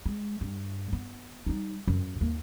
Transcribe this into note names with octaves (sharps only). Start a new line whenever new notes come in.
G#3
G2
B3
G3 D#4
F#2 E3
D#2 A#3